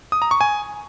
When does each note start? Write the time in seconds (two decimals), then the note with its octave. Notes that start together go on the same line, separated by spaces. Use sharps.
0.12 D#6
0.22 A#5
0.31 C#6
0.41 G#5